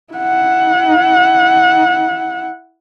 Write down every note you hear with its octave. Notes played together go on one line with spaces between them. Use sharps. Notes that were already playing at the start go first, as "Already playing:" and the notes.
E4 F#5